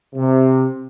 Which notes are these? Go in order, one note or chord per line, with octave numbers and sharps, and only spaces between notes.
C3